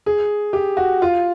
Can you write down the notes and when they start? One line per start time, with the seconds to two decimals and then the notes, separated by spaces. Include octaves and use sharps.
0.06 G#4
0.53 G4
0.77 F#4
1.02 F4